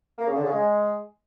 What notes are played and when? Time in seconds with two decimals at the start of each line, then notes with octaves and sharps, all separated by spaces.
0.19 A#3
0.27 C#3
0.36 D3
0.44 C#3
0.53 G#3